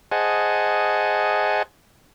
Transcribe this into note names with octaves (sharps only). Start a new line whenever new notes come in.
G#4 C5 D#5 F#5 G#5 A5